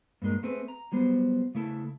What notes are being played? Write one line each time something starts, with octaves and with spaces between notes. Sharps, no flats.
G2 A#2 G#3 A#4
A3 C4 G#4 B4
A#5
F#3 G3 B3 C5
C#3 A3 E4 A4 A5